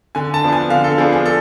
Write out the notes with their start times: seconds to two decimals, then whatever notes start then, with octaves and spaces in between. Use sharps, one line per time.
0.15 D3 G#5
0.34 A5
0.42 F3 B3 D4
0.53 G#5
0.70 D3 F5
0.84 A4
0.98 F3 B3 D4 G#4
1.13 G#4
1.26 A4